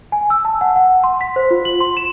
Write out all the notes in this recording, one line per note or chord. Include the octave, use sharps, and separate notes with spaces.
G#5
E6
A5
F#5
F#5
C6
B6
C5
F4
F#7
C6
E7